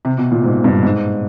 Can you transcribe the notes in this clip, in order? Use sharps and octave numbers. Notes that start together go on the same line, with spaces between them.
C3
B2
A#2
G#2
G2
G#2